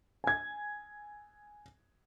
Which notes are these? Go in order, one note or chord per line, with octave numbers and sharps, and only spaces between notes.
G#5 G#6